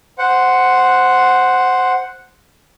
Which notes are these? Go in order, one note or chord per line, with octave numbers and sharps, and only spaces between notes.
C5 F#5